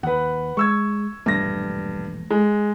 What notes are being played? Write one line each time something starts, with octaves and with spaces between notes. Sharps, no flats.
D#2 B4 F#5
G#3 C#6 E6 G#6
E1 A#1 G2 A3 A#6
G#3